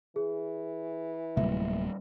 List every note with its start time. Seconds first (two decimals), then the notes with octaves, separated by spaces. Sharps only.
0.16 E3 G#4
1.37 D1 C3 F#3 G3 A3 A#3 E5